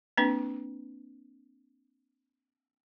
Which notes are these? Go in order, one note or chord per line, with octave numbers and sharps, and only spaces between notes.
A#3 C4 D4 B4